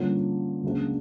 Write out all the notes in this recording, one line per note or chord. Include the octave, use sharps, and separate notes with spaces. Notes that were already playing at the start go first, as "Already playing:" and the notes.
Already playing: G2 D3 F3 A#3 C#4
C#2 C#3 F#3 A#3 D4